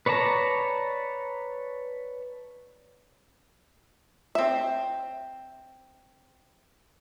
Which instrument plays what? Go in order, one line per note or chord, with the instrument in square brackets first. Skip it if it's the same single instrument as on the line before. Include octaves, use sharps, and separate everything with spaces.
[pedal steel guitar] B4 C#5 D5 A5 A#5
[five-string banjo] C4 E5